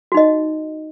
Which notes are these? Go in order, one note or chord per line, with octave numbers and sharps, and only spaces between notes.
D#4 F#4 D#5